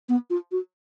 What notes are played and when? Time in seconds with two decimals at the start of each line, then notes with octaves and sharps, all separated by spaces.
0.09 B3
0.30 F4
0.52 F#4